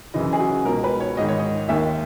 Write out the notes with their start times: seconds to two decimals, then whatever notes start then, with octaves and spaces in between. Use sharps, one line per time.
0.14 F#2 C#3 E3 D#5
0.33 G#4
0.40 F#4
0.65 C#2 B2 A#4
0.84 B4
1.00 C#5
1.17 G#2 D#3 D#5
1.29 C#5
1.39 D#5
1.69 D#2 D#3 E5